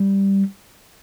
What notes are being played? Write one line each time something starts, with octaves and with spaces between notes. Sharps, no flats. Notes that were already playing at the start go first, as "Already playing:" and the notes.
Already playing: G3